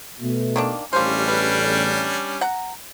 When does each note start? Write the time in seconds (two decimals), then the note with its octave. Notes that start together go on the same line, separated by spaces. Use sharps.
0.21 B2 A3
0.56 D#3 A#3 D4
0.93 A1 E2 G3 A#3 C#4 D4 C5
1.28 B4
2.41 F#5 A#5